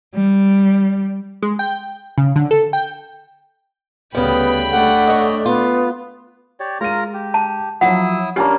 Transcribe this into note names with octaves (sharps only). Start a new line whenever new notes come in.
G3
G#3
G5
C#3
D3
A4
G5
D2 C#3 G3 B3 G5 B5
A3 D4 F#5
C#5 D#5
B3 F4
G4 C#5 D5
G#3 F4 A#4 A#5 D#7
G4
A5
F3 F#3 E4 F#5 D#6 E6
A#3 C#4 D4 G4 A5 B5